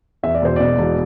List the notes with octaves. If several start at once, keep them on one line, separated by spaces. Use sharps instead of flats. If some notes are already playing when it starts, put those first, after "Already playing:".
E2 E5
D5
E1 C5
B2 D5
E1